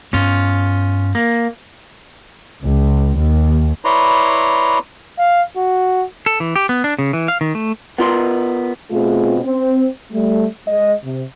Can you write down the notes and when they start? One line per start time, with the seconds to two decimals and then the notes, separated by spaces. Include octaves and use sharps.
0.13 G2 B3 C#4 F4
1.15 A#3
2.61 C#2
3.17 D#2
3.85 E4 B4 C#5 D5 A#5 C6
5.19 F5
5.57 F#4
6.26 A4
6.40 E3
6.56 G4
6.69 B3
6.84 D4
6.99 C#3
7.13 E3
7.28 F5
7.41 D#3
7.55 A3
7.98 B3 F4 A#4 C6
8.92 B2 A3 C4 F4 G#4
9.44 C4
10.13 G3 A3
10.68 G#3 D#5
11.04 C3